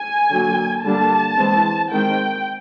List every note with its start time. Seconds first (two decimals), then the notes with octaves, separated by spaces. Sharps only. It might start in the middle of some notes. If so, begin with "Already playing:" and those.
Already playing: G#5
0.31 D3 F#3 A#3
0.84 D3 G3 A#3 D4 A5
1.38 E3 G#3 C4
1.92 D#3 G#3 C4 G5